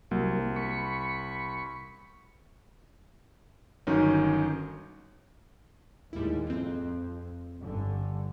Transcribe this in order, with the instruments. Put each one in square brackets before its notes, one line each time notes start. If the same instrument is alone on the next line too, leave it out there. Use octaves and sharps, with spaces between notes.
[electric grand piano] C2 [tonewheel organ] F#3 A#3
[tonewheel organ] B5 C#6
[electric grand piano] G1 D#3 F#3 C#4 D#4
[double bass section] D#2 A2 G#3 [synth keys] G3 E4
[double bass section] F2 [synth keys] C4 F4
[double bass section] G1 D3